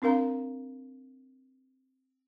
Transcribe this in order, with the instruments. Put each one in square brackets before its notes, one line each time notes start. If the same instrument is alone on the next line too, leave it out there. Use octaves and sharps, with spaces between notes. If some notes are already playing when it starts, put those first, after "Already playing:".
[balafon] C4 D4 A#4 F5 A#5